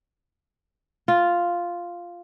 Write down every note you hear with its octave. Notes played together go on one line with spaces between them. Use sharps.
F4